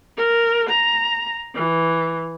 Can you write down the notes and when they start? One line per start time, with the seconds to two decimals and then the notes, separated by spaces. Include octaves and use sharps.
0.17 A#4
0.69 A#5
1.55 E3